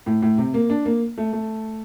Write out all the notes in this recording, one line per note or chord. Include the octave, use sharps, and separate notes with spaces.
A2
A2
C3
A#3
D4
A#3
A3
A3